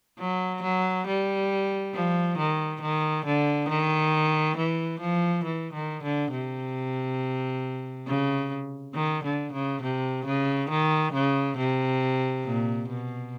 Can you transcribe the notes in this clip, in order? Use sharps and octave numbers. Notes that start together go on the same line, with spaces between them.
F#3
F#3
G3
F3
D#3
D#3
D3
D#3
E3
F3
E3
D#3
D3
C3
C#3
D#3
D3
C#3
C3
C#3
D#3
C#3
C3
A#2
B2